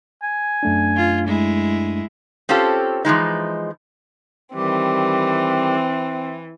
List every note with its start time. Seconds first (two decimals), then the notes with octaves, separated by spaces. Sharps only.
0.23 G#5
0.63 F#2 A3 D4
0.96 F4
1.27 G#3 E4
2.49 C4 C#4 F4 G4 A4
3.05 E3 F3 G#3 D#4
4.55 D#3 E3 G3 C4 G4